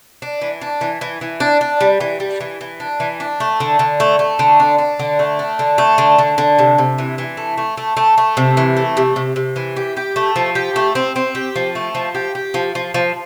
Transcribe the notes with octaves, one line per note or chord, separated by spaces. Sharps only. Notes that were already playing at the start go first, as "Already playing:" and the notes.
D4
E3
D4
E3
E3
E3
D4
D4
G3
E3
G3
E3
E3
D4
E3
D4
A3
D3
D3
A3
A3
D3
D4
D4
D3
A3
D4
D3
A3
D3
D3
D3
C3
C3
E3
E3
A3
A3
A3
A3
A3
C3
E3
A3
C3
C3
C3
E3
G4
G4
A3
F3
G4
A3
C4
C4
G4
F3
A3
F3
G4
G4
F3
F3
F3